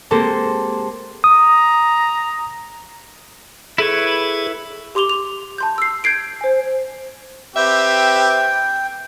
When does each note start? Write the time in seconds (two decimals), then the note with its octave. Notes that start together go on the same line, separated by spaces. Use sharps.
0.11 G#3 A#3 C4 G4 A4 C5
1.24 A#5 D#6
3.78 E4 G#4 A4 B4 C#5
4.95 G4 C6 D6 F7 G7
5.10 F7
5.58 A5 C6 G6
5.78 E6 C7
6.04 G6 G#6 C7 D7
6.41 C5 G#5
7.56 C4 G4 B4 E5 G5